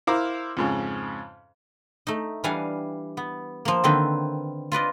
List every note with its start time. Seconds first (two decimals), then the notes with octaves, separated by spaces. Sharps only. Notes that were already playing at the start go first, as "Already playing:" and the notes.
0.07 E4 A#4 C5 F5 A#5 D6
0.57 F2 G#2 C#3
2.07 A3 D#4
2.44 E3 G3 D4 F5 F#5 G#5
3.17 B3
3.65 F3 A#3
3.84 D3 D#3 A#3 C4 B4 E5
4.72 F4 B4 D5 D#5